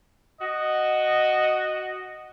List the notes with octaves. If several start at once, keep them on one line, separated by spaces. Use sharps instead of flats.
F#4 D#5